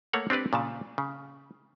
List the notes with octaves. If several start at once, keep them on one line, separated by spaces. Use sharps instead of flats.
A3 A#3 C#5 F#5
C4 D4 G4 B4 D5
A#2 C#3 A5
C#3